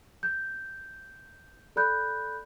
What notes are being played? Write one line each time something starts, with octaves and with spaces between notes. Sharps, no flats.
G6
A4 D5 B5 F#6 G6